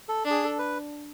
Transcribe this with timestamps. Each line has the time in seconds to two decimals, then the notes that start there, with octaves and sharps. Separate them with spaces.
0.09 A4
0.25 D4
0.31 G#4
0.44 A4
0.58 B4